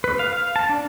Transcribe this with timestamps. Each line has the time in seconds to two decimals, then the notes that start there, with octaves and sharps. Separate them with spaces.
0.04 B4
0.19 F5
0.33 F5
0.56 A5
0.69 D4